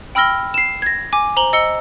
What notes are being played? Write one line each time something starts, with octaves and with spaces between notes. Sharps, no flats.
G5 B5 E6 F6 A#6 G7
C7 E7
G#6 A#6
G#5 D6
C5 A#5 F#7 G7
D#5 E6 C#7 G7